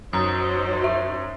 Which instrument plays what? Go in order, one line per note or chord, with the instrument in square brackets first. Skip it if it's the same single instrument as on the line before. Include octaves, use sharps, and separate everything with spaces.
[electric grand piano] F#2 [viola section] F#3 D#4 C5 [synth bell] A#5 D#6
[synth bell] E5